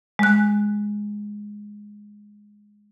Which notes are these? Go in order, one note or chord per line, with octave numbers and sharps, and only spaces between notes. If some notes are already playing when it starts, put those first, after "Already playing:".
G#3 F#6